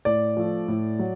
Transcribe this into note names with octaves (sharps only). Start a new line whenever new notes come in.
A2 D5
F3 A3
A2
F#3